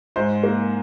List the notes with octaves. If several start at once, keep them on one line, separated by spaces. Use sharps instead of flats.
G#2 C5
A#3